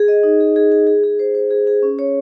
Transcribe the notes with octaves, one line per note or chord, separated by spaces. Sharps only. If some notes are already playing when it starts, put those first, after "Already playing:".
Already playing: G#4
D#5
D#4
G#4
G#4
G#4
G#4
G#4
C5
C5
G#4
G#4
C#4
C#5